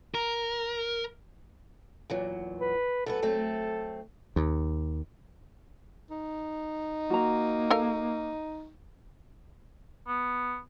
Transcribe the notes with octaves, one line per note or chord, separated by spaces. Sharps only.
A#4
E2 A#2 F#3
B4
F#2 B3 A4 B4
F#3 A3 C4
D#2
D#4
A#3 F#4 A#5
A4 A#4 F5
B3